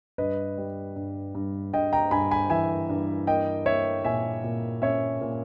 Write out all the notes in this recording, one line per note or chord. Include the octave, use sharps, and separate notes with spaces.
G2 B4 D#5
G3
G2
G2
G2 D#5 G5
G5 A#5
G2 G#5 B5
G#5 B5
E3 E5 G#5
G2
A#3 D#5 G5
A#3 C#5 E5
A#2 E5 G#5
A#2
C#4 C#5 E5
A#2